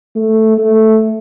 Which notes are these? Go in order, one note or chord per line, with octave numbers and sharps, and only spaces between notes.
A3
A3